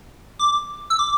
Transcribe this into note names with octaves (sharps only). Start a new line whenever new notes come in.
D6
E6
D6